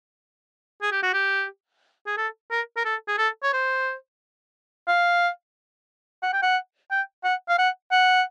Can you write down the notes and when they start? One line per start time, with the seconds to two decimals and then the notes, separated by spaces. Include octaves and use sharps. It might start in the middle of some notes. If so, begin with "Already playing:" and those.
0.82 G#4
0.92 G4
1.03 F#4
1.14 G4
2.07 G#4
2.17 A4
2.51 A#4
2.77 A#4
2.85 A4
3.08 G#4
3.18 A4
3.43 C#5
3.53 C5
4.88 F5
6.23 F#5
6.33 G5
6.43 F#5
6.91 G5
7.24 F#5
7.49 F5
7.59 F#5
7.91 F#5